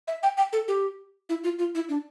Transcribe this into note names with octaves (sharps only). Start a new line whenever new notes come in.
E5
G5
G5
A4
G4
E4
F4
F4
E4
D4